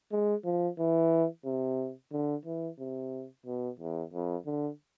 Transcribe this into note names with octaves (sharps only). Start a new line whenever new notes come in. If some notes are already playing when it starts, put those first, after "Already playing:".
G#3
F3
E3
C3
D3
E3
C3
B2
E2
F2
D3